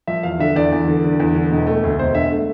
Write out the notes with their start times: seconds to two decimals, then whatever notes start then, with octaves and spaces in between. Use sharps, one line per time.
0.07 F3 E5
0.23 E2 F5
0.39 D3 E5
0.56 E2 D5
0.72 E2
0.88 D3
1.04 D3
1.20 E2
1.35 D3
1.51 E1
1.67 A3
1.83 D2
1.99 E1 C5
2.15 D3 E5
2.31 A3